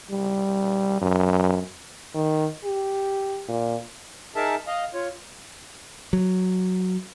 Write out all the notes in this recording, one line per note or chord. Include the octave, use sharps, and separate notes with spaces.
G3
F#2
D#3
G4
A#2
D#4 G#4 A#4 E5 A5
D#5 F5
F4 C#5
F#3